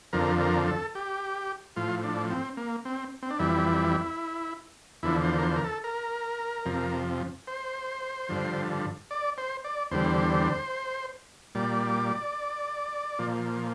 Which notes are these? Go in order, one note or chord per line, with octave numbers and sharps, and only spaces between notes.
F2 D3 F3 A#4
A#4
A4
G4
A2 F3 F4
D4
C4
A#3
C4
C4
D4
F2 E3 G3 E4
E2 D3 F3 E4
C5
A#4
C5
A#4
A4
A#4
F2 C3 F3
C5
G2 D3 F3
D5
C5
D5
E2 D3 G3 C5
A#2 G3 D5
A#2 F3